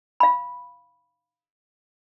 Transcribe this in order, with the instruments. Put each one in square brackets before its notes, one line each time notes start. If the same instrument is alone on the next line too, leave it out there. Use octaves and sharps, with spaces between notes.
[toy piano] F5 B5